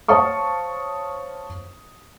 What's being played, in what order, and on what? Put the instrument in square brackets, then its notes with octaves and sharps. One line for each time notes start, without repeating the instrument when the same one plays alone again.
[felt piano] C5 C#5 F5 A5 C#6 D#6